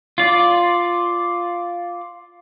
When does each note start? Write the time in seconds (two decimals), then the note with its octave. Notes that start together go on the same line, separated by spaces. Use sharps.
0.18 F4 D5